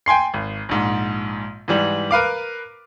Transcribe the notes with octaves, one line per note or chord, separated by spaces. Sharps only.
G5 G#5 C6 C7
G#1
A#1 G#2
G#2 E3 G3
A#4 B4 F5 D6